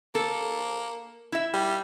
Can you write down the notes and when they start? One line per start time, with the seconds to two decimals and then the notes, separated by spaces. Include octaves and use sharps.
0.15 A#3 A4
1.32 E4 E5
1.54 G3